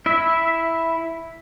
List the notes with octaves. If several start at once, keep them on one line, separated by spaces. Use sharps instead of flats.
E4 E5